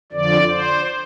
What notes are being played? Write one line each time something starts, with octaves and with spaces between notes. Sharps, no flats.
F2 D3 F3 D5
C5